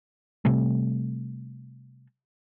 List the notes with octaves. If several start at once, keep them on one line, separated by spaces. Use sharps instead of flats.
C3 G3 A3